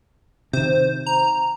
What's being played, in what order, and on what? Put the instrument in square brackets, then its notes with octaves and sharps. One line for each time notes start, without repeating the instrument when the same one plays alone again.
[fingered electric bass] C3 D#3 [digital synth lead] C5
[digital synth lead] A#5